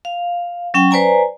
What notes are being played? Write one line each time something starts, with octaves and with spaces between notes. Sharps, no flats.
F5
F#3 C#4 G5
B4 C5 D5 G#5 A#5